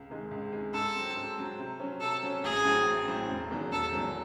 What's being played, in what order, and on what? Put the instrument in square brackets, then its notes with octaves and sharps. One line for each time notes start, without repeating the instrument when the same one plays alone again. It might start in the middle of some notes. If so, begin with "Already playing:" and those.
Already playing: [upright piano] C#2
C3 D#3 G#3
C#2
C3 D#3 G#3
[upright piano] G#2 [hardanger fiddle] A4
[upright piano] F#3 C4
G#2
F#3 C4
C3
F#3 C#4
[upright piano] C3 [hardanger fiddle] A4
[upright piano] F#3 C#4
[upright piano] A1 [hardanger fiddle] G#4
[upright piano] A2 F#3 C4
A1
A2 F#3 C4
E1
E2 D#3 F#3
[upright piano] E1 [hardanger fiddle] A4
[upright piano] E2 D#3 F#3